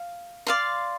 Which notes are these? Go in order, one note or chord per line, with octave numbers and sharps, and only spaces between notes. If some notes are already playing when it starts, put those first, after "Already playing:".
Already playing: F5
D5 F5 C6